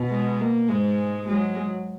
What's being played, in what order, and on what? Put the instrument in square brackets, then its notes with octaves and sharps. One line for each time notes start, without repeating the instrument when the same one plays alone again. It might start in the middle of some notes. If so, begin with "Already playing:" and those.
Already playing: [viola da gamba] B2
[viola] G#3
A#3
[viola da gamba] G#2 [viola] G#3
[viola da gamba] F#3 [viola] G#3